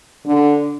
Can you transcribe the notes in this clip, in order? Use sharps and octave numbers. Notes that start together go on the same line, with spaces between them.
D3